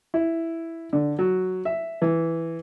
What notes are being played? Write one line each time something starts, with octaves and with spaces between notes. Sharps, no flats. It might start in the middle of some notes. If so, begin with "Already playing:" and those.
E4
D3
F#3
E5
E3